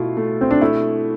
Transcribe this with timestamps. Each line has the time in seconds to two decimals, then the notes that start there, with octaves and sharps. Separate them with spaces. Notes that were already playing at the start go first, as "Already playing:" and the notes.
Already playing: B2 A3 E4 F4
0.17 A3
0.41 C4
0.51 D4
0.61 A3 E4